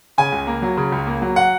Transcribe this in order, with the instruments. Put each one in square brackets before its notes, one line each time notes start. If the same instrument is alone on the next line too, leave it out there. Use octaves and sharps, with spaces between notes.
[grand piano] C#3 G#5
C#2
A#3
F#3
C#3
C#2
A#3
F#3
F#5